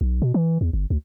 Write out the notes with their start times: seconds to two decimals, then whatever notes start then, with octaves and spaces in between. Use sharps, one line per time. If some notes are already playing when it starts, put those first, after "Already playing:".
0.01 B1
0.22 B2
0.34 E3
0.61 E2
0.73 G1
0.90 D2